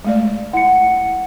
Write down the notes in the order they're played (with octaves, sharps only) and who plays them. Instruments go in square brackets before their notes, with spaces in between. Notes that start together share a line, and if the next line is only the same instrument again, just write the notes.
[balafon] G#3 A3 D5
[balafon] E4 [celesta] F#5 C#7